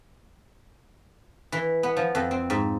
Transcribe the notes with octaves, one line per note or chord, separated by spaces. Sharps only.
E3
B3
F3
F2
C4
G#2